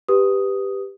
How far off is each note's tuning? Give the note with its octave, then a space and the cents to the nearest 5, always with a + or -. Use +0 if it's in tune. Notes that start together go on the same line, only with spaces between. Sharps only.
G4 +10 B4 +0 D#6 +0